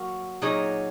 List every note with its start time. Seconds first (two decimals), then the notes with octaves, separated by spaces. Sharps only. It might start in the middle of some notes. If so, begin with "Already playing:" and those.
Already playing: F#3 A#3 F#4
0.42 A#2 F#3 D#4 G#4 C#5